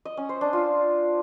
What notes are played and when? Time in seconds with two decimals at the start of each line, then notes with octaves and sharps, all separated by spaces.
0.05 D#5
0.17 C#4
0.29 C5
0.41 D4
0.53 F4